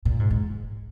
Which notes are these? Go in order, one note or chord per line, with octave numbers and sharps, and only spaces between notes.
A#2
G#2
G#2